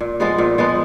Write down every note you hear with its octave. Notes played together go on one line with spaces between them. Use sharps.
A#2
F3 G#3 B3
A#2
F3 G#3 B3